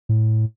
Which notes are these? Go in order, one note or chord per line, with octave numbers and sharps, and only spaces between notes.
A2